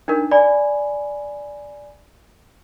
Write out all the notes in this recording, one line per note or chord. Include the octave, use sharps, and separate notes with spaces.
D4 D#4 A#4
D5 G#5 B5